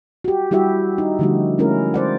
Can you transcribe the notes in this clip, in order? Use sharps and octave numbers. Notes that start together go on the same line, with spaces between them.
F#4 G4
G3 E4 F#4 G4 E5
D#4
D3 F3 G3 A3 F#4
G#3 A3 C#4 E4 G#4 A#4
C5 D5 F#5